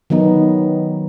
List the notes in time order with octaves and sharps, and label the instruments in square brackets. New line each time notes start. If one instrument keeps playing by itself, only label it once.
[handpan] D#3 F#3 B3 D#4